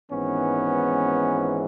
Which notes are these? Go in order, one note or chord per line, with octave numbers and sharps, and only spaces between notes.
G#1 G#2 E3 B3 C#4